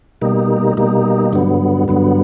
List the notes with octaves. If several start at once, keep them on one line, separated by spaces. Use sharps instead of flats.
B2 G3 A#3 D#4
B2 G3 A#3 D#4
G2 D3 F#3 B3
G2 D3 F#3 B3